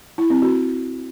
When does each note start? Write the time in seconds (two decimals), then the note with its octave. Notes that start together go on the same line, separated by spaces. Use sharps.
0.18 E4
0.30 C4
0.42 F#4